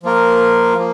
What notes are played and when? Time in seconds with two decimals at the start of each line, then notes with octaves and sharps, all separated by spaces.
0.03 F3 A#3 F4 A#4
0.77 F3 A#3